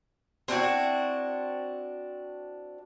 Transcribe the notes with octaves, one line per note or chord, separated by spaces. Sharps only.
C4 D4 E4 F#4